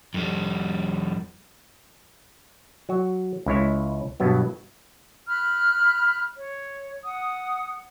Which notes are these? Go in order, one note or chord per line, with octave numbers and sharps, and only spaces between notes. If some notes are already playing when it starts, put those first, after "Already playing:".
F2 G3
F#3 F#4
C#2 E4 C#5
G2 B2 F#3 B3
B5 F6 F#6
C#5
F#5 D#6